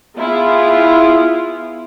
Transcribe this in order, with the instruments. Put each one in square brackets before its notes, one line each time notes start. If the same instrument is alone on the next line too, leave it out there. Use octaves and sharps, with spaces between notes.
[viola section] B3 E4 F4 G#4